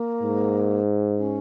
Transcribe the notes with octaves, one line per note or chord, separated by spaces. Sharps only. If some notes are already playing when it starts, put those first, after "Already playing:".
Already playing: A#3
G#2
C#4